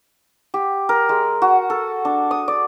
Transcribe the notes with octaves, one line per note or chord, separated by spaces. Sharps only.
G4
A#4
G#3
F#4
A4
D4
D#6
D5